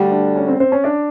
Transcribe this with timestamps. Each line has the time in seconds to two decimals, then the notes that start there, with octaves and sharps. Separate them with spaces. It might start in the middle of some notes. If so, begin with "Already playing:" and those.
Already playing: D2 D3 G3
0.11 D4 D5
0.36 C#4 C#5
0.48 C4 C5
0.60 C4 C5
0.72 C#4 C#5
0.84 D4 D5